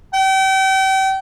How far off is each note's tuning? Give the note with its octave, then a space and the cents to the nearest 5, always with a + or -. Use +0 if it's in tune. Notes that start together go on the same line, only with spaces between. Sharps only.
G5 -35